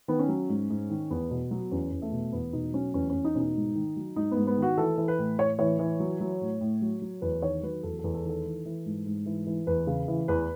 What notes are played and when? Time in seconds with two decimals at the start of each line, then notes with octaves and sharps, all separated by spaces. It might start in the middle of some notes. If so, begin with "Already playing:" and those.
0.08 D#3 B3
0.19 C#4
0.29 F#3
0.49 G#2
0.70 G#2
0.90 D#3
1.10 E2 B3
1.31 B2
1.51 F#3
1.72 E2 C#4
1.92 E2
2.02 A3
2.12 B2
2.32 E2 B3
2.53 B2 D#4
2.73 F#3 C#4
2.94 E2 C#4
3.10 E2 C#4
3.25 D#4
3.35 B2 C#4 D#4
3.56 G#2
3.75 D#3
3.97 F#3
4.16 G#2 D#4
4.31 B3
4.37 G#2
4.47 B3
4.58 D#3 F#4
4.78 E3 A4
4.98 E3
5.08 B4
5.18 A2
5.38 A2 C#5
5.59 E3 C#5
5.79 E3
6.00 F#3
6.20 F#3
6.41 A2
6.61 A2
6.82 F#3
7.02 F#3
7.22 E2 B4
7.42 D#3 C#5
7.63 F#3 B4
7.83 E2 A4
7.99 A4
8.04 E2
8.14 A4
8.24 D#3 A4
8.45 E3
8.65 E3
8.86 G#2
9.06 G#2
9.26 E3
9.47 E3
9.67 E2 B4
9.87 C#3
10.08 E3
10.28 E2 B4